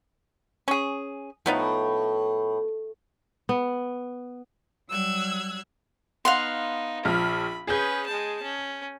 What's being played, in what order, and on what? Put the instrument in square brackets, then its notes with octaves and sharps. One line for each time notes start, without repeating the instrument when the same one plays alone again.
[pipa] C#4 G#4
[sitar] A2 [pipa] F3 B3 D#4
[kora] B3
[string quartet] F#3 G3 E6 F#6 G#6
[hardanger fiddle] B3 D#4 [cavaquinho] F5 F#5 C6
[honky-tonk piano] A#1 F3 F6 [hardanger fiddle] B5
[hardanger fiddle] C#4 B4 [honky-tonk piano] G#4 G6
[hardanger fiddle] G#3 A5
C#4